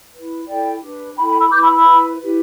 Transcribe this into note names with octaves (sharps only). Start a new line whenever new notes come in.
E4 B4
E4 A4 D5 G5
D4 G4 B4
E4 A4 G5 B5
G5 B5
B5 E6
E4 B4 D6 G6
B5 E6
B5 E6
E4 B4
E4 G4 B4